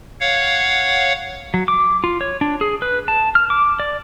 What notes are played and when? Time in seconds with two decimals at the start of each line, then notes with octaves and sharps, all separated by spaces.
0.20 C#5 F5 F#5
1.54 F#3
1.68 D6
2.04 F4
2.21 C#5
2.41 D4
2.61 G#4
2.82 B4
3.08 A5
3.35 F6
3.50 D6
3.80 D5